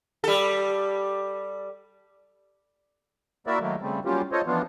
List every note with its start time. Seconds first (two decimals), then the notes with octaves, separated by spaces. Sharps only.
0.24 G3 A4
3.47 A#3 E4 F#4 A#4 D5 E5
3.61 D#3 F#3 A3 A#3
3.82 C#3 G3 A3 C4
4.05 F#3 G3 A#3 C#4 F4 G4
4.32 F4 A4 C5 C#5 D#5
4.47 E3 F3 B3 D4 F4